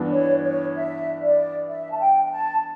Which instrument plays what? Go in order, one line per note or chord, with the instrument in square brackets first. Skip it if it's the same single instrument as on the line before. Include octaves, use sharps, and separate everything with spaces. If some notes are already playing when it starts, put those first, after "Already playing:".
Already playing: [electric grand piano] G2 E3 B3 D4
[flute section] C#5
C#5
E5
D5
E5
A5
G5
G5
A5